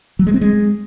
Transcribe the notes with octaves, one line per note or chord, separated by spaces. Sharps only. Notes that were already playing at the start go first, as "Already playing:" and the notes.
F#3
G#3
C4
G#3